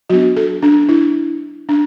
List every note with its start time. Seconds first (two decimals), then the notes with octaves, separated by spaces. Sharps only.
0.10 F#3 B3 D4 F#4
0.37 A4
0.62 D4
0.89 E4
1.69 D4